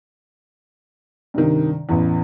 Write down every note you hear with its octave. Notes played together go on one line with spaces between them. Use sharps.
G2 C3 D#3
A1 E2